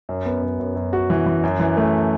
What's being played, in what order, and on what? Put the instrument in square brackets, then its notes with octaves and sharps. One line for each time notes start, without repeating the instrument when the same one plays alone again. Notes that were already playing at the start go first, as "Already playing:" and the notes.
[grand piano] F#2
B3
F#2
F#2
F#2
F#4
E3
E3
F#2
E3
A3